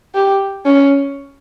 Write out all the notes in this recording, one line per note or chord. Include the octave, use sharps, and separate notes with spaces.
G4
C#4